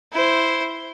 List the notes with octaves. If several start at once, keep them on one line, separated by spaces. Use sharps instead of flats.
E4 C5